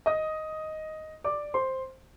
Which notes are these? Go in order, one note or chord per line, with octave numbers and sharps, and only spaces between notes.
D#5 D#6
D5 D6
C5 C6